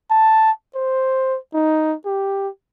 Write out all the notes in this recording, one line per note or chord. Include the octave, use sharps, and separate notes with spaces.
A5
C5
D#4
G4